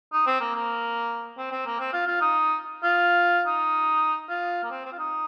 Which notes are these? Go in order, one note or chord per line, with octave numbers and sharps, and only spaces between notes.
D#4
C4
A#3
A#3
C4
C4
A#3
C4
F4
F4
D#4
F4
D#4
F4
A#3
C4
C4
F4
D#4